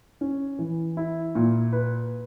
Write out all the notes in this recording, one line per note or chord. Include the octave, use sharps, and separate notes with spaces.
C#4
E3
E4
A#2
B4